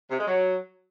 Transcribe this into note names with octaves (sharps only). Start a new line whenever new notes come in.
C3
G#3
F#3